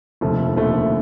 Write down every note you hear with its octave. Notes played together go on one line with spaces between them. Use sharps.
F1 D#2 D3 F3 A3
F1 D#2 D3 F3 A3